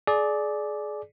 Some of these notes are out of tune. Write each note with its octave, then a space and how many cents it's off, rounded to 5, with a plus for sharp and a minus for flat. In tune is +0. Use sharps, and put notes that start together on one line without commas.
G#4 +30 D5 +0